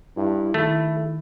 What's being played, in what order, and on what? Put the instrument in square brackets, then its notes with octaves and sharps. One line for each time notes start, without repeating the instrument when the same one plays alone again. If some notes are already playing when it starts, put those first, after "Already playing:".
[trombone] G2 [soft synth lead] E4
[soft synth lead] D#3 [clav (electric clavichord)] A3 [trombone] E4